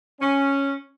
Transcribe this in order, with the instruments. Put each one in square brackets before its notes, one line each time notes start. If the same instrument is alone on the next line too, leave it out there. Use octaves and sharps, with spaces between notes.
[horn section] C#4